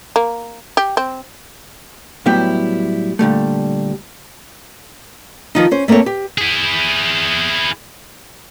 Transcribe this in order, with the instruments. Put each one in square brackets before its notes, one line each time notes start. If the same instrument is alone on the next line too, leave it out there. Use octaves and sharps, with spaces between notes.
[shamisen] A#3
G4
C4
[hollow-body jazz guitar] A2 F#3 G3 B3 E4 G4
A#2 D3 G3 A3
[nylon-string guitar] D#3 F3 D#4
C#4 C5
A3 A#3 C4 A4 C#5
G4
[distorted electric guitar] E4 G#4